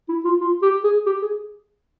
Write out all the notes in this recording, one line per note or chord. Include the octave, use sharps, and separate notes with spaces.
E4
F4
F4
G4
G#4
G4
G#4